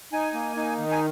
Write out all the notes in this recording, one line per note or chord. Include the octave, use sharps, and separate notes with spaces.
D#4 G#5
A#3
D#4
D#3
G#5